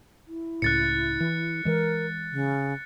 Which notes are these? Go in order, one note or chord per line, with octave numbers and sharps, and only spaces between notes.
E4
C#2 A2 F#6 A6 C#7
E3
E3 G#3 A#4
C#3